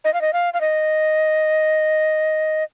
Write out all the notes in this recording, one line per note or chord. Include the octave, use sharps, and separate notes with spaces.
D#5
F5
D#5
F5
F5
D#5